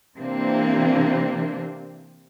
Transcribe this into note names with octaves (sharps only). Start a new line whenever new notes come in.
C3 E3 A#3 C4 D4